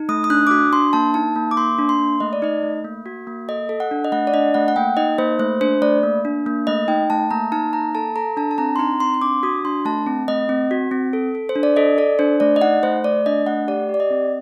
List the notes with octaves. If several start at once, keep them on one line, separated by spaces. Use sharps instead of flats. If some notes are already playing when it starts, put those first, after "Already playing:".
Already playing: D#4
A3 D#6
D#6
D4 F#6
D6
F#4 D#6
D4 C6
A#3 A5
D#4 A5
A#3
D6
A#3 C6
D4
C6
A#3
A3 D#5
D5
D#4 D#5
A3
A#3
F#4
A#3
A4 D#5
A4
F#5
D4
D#5
A3 F#5
D5
D4 D#5
A3 F#5
F#5
A#3 G5
D#4 D#5
A#3 C5
A3 C5
D4 C5
A3 D5
A#3
D4
A#3
A3 D#5
D#4 G5
A3 A5
A#3 A#5
D#4 A5
A#3 A#5
A4 A5
A4 A#5
D4 A5
A5
C4 A#5
C6
D#4 A#5
C4 C6
C6
D4 D6
F#4 D#6
D4 C6
A3 A5
C4
A3 D#5
C4
F#4
C4
A4
A4
C5
D4
D5
A4 D#5
A4 D5
D4 C5
A3 D5
D#5
D#4 F#5
A3 C5
A3 D5
D4 D#5
A3 F#5
G4 D5
G4
D5
D#5
C4